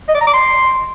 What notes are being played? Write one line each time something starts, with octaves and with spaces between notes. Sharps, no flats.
D#5
D5
A#5
D6
C6